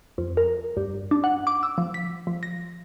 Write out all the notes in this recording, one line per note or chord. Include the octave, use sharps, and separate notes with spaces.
F2
A#4
G2
D4
F#5
D6
E6
F3
B6
F3
A#6